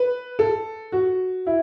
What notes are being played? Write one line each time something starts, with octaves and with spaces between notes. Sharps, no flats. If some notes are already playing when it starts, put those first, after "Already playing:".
Already playing: B4
A4
F#4
E4